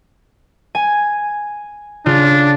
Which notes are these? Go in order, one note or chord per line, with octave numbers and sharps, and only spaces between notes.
G#5
C#3 D4 F4